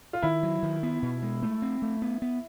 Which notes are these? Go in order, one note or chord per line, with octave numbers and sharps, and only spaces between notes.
F4
D#3 E4
F#3
D#3
B3
B2
G#3
A3
C4
A3
B3
B3